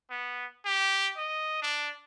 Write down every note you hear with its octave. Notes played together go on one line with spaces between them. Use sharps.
B3
G4
D#5
D4